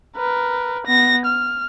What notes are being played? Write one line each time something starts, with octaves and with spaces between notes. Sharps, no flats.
A#4 B4
B3 A#6
F6